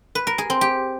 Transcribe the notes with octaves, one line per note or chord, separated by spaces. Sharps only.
B4
A#4
G#4
C4
G4